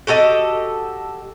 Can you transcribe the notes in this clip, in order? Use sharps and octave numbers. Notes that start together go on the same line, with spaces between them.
F#4 G4 A4 D#5